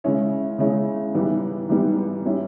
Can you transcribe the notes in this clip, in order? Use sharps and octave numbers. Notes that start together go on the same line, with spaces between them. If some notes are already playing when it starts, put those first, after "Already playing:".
C#3 G#3 C#4 E4
C#3 G#3 C#4 E4
G#2 E3 G3 B3
G#2 E3 G3 B3
G3 C#4 E4